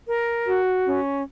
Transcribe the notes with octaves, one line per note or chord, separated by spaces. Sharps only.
A#4
F#4
C#4